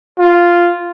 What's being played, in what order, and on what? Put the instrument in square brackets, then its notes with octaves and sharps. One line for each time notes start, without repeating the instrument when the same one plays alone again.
[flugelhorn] F4